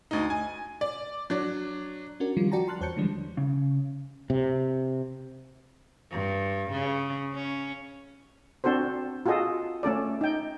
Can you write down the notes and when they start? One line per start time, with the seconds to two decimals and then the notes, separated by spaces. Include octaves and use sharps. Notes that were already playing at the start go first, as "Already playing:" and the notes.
0.11 D2 D#4
0.30 G#5
0.81 D5
1.30 F#3 D4
2.20 C#4 D4 F#4 A#4
2.37 D#3 F3 G3 F4
2.52 F#4 D5 G5 A5 A#5
2.67 A5 C6 F6 F#6 A6
2.81 E2 C5 C#5 A5 G6 C#7
2.96 D3 E3 F3 G3 G#3 D4
3.37 C#3
4.30 C3
6.11 G2
6.71 C#3
7.33 C#4
8.64 C4 D4 F#4 A4 C5
9.26 F4 F#4 G#4 A4 D#5
9.83 A3 C#4 A4 D5
10.21 D#4 G5